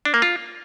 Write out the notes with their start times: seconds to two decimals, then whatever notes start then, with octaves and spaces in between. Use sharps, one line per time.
0.05 D4
0.14 A#3
0.22 F4